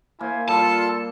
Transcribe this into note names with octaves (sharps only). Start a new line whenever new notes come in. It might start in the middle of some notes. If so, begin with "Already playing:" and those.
A#3 E4 C5 G#5
G3 F4 A4 A5